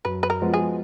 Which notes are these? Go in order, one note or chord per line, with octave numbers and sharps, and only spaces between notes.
F#2 B4
B4
A#4
F3 G#3 B3 F#4
G#4